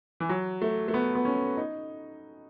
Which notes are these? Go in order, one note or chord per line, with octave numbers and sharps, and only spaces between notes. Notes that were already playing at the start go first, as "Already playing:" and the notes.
E3
F#3
A3
A3
B3
B3
C#4
D#4